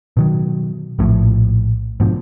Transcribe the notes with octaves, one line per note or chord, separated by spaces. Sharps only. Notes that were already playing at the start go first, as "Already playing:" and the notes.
B2 D#3 F#3
A#1 A2 C3 F3
G#2 B2 D3 F3